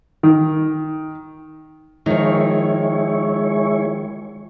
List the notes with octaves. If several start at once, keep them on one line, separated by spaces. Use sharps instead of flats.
D#3
D#3 F3 G#3 E4 C#5